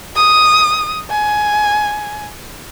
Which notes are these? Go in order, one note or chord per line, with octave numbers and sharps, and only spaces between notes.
D#6
G#5